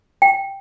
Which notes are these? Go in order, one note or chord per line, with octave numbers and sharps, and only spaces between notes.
G5